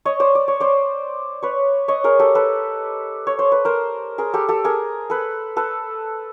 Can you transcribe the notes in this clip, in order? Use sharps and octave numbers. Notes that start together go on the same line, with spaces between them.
C#5 D#5
C5 D5
D5
C#5
C5 D5
B4 C#5
C#5 D#5
G#4 A#4
G4 A4
A4 B4
C#5
C5
B4
A#4 C5
G#4 A#4
G4 A4
G4 A4
G#4 A#4
A4 B4
A4 B4